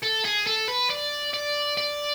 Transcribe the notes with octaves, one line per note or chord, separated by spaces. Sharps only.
A4
G#4
A4
B4
D5
D5
D5